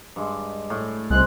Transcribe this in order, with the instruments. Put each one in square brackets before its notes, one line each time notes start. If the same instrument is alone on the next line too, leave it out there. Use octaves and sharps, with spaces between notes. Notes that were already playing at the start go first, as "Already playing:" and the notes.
[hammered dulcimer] G2 G#3
A2
[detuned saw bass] C2 [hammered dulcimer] G#3 C5 [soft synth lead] F#6